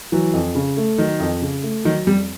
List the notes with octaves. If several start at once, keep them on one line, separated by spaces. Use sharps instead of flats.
E3 F#3
F2
C#3
A3
D#3 F#3
F2
C#3
A3
D#3 F#3
F2 G3